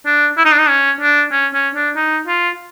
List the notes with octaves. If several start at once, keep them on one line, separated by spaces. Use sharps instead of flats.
D4
E4
D#4
D4
D#4
C#4
D4
C#4
C#4
D4
D#4
F4